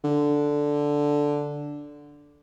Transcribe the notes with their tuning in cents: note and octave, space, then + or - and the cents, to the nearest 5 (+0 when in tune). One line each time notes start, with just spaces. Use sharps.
D3 -5